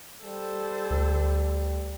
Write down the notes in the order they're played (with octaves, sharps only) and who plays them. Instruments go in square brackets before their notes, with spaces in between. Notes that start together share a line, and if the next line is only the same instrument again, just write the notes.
[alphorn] G3 [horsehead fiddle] A4 C5
[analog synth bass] D2